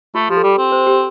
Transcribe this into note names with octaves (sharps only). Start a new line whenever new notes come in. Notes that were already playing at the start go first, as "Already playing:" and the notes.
A3 F4
F3 G4
A4
G3 G4
C4
C5
G4